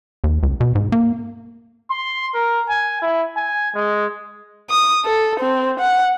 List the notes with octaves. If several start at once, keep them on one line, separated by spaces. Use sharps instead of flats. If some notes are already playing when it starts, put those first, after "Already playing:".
D#2
C#2
B2
G#2
A#3
C6
A#4
G#5
E4
G#5
G#3
D#6
A4
C4
F#5